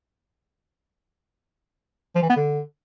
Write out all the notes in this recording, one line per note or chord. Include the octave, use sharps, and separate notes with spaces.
F3
E3
B3
D3